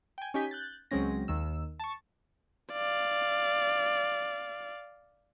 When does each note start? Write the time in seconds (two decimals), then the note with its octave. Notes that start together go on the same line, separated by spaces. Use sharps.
0.18 G5 G#5
0.34 C#4 D#4 G4 G#5 G6 B6
0.51 F#6 G6 A6
0.91 C#2 F#3 G#3 C4 C#4 A#6
1.28 D#2 D#3 E6
1.80 A5 C#6
2.73 D5 F5